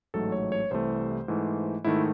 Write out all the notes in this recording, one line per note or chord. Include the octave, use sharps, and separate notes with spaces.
A1 G#2 F#3 A3 A4
C#5
C#5
C2 C3 E3 A3 C5
G#2 E3 A3
G#2 D#3 A3 E4